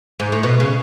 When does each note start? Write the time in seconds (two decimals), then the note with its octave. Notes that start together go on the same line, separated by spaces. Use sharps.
0.20 G#2
0.32 A2
0.43 B2
0.60 C#3